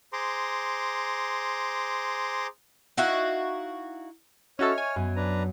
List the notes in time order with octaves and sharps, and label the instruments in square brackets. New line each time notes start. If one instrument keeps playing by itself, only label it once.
[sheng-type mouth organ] G#4 C5 A#5 C6 D6
[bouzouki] D#4 E4 F#4 F5
[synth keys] C#4 F#4 A4 [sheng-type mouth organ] C#5 F6 [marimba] D#5 E5 C#6
[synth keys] G#5
[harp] F#2 [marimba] B3
[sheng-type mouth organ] D4 B4 A#5